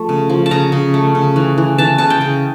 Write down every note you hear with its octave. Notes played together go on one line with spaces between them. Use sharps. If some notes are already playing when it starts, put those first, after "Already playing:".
Already playing: F3 A3
C#3
F3
A5
C#3 A#5
C#3
A3
C#3
E3
E3
E3 A5
C#3 A5
G5
C#3